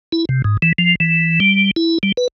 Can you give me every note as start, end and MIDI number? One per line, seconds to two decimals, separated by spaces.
0.12 0.25 64
0.29 0.42 48
0.44 0.57 44
0.62 0.73 52
0.78 0.95 53
1.00 1.40 52
1.40 1.71 55
1.76 1.98 64
2.03 2.12 55
2.17 2.28 71